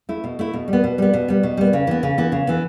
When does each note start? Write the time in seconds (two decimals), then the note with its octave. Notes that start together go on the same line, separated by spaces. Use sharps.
0.09 A3 E4
0.24 B2
0.39 A3 E4
0.54 B2
0.68 G3
0.73 B3
0.84 B2
0.98 G3 B3
1.14 B2
1.28 G3 B3
1.43 B2
1.57 G3 B3
1.73 C#3
1.87 E3 B3
2.03 C#3
2.18 E3 B3
2.32 C#3
2.47 E3 B3